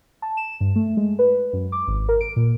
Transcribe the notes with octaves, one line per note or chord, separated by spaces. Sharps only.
A5
E7
G2
A3
G#3
B4
F#2
D6
G#1
A#4
D7
A#2